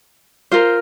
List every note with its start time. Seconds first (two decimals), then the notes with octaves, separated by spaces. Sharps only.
0.51 F4 A#4 C5